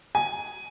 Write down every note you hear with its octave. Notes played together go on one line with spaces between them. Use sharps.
G#5